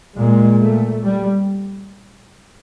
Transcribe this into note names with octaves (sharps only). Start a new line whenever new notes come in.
A#2 G#3
A3
G3